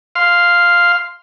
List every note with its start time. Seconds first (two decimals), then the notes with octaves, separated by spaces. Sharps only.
0.15 F5 C6